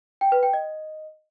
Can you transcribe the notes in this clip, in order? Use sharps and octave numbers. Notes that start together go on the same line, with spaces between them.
G5
B4
G5
D#5